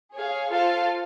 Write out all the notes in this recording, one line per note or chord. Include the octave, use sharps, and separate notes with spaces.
G#4 C#5 F5
F4 A4 C5 F5 A5